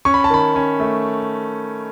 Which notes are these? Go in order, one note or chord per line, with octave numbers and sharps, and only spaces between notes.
C#4 C#6
B5
A5
D#3 B5
C#4
A3